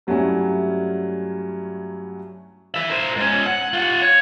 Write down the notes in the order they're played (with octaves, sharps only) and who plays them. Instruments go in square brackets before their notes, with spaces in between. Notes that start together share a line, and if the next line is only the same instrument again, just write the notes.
[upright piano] G2 F#3 G3 A3 C#4 E4
[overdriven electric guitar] E3 E5
A#4 C5
G#2 C#4
F#5
F4 F#5
C#5